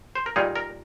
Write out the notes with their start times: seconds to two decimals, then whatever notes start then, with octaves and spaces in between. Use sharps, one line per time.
0.15 C5
0.26 A#4
0.36 A#2 G3 A#3 D#4 G#4
0.56 A#4